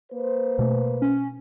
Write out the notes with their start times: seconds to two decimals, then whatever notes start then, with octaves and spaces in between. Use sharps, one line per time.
0.13 A#3 B4 C5
0.59 B2 A3
1.02 C#4